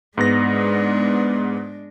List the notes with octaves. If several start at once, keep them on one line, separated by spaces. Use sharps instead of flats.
G#2 G#3 B3 D4 A#6